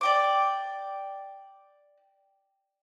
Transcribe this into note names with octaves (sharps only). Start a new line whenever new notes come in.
D5 G5 D6